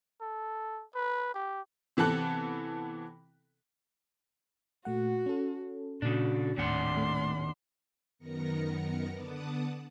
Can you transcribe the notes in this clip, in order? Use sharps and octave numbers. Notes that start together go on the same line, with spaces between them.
A4
B4
G4
C3 E3 B3 A4 F#6
A#2 A3 F#4 F#5
C#4 A4
A#2 C#3 D4 F#4
D#1 D#2 A2 C4 D4 F#5 C6
A3
F#2 D#3 B3 A#4 A#6 C#7
D3 B3 F#5 A5 D6 D#6